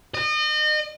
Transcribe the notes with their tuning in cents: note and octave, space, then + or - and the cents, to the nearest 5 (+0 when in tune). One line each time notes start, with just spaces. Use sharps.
D#5 -35